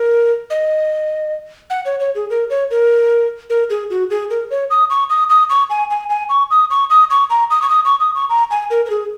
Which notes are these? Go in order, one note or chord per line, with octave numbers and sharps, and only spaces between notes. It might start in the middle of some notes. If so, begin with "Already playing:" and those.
Already playing: A#4
D#5
F#5
C#5
C#5
G#4
A#4
C#5
A#4
A#4
G#4
F#4
G#4
A#4
C#5
D#6
C#6
D#6
D#6
C#6
G#5
G#5
G#5
C#6
D#6
C#6
D#6
C#6
A#5
D#6
C#6
D#6
C#6
D#6
C#6
A#5
G#5
A#4
A#4
G#4